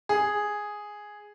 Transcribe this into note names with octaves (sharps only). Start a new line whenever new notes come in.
G#4